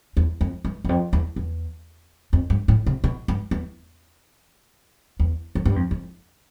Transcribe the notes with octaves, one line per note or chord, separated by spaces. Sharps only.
E2
F2
G2
E2
F2
E2
E2
F2
G2
A2
C3
B2
G2
E2
E2
F2
G2
F2
F2